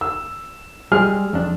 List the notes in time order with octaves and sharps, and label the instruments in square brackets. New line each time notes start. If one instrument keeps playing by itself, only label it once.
[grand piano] E6
[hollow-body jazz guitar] G3 G#3 G#4 [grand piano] F6
[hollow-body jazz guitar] F2 D4